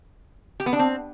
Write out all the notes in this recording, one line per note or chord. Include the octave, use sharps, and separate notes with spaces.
G4
B3
D4
C4